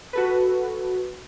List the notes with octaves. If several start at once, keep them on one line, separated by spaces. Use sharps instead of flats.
F#4 A4 B4